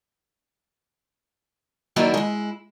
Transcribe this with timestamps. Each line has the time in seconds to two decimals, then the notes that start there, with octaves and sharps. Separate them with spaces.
1.96 D#3 F#3 A#3 D4 E4 F#4
2.14 G#3 E4